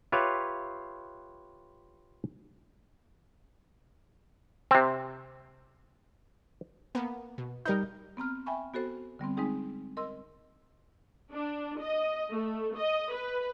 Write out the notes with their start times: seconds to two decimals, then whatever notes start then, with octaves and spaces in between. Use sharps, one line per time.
0.12 F4 G4 B4 C#5 E5 F5
4.71 C3 C4
6.95 A#3 B3
7.38 B2
7.65 G3 D#4 A#4 G6
8.17 B3 C4 A#5 F6
8.46 E5 G5 G#5 B5 C#6
8.74 B3 F#4 A4 C5
9.19 D3 G3 B3 C4
9.37 G#3 C4 C#4 D#4 G#4 G5
9.97 A#4 D#5 C6 E6
11.32 D4
11.80 D#5
12.31 A3
12.76 D#5
13.12 B4